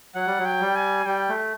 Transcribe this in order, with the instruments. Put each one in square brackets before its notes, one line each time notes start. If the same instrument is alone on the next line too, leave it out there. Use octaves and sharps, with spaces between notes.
[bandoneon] F#3 [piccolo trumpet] F#5
[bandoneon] G3
F#3
[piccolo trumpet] G5
[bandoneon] G3
[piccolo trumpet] G#5
[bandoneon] G3 [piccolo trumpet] G5
[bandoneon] A3